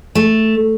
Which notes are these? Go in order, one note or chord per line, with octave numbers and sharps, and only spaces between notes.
A3